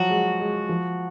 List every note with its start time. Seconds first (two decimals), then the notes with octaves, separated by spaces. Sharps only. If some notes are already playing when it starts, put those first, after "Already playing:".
Already playing: F3 F#3 F#4
0.10 G#3
0.40 G#3
0.69 F3